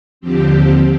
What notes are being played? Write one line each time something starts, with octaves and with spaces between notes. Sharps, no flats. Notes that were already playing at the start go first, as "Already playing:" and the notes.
D#2 D3 F3 C4 G4